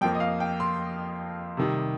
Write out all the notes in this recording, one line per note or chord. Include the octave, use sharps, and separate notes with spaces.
F2 F3 A#3 G5
D#5
F5
G5
C6
C3 D#3 G3